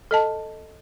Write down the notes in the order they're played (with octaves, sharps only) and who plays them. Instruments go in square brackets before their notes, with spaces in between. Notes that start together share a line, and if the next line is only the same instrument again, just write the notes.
[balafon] A4 D#5 A5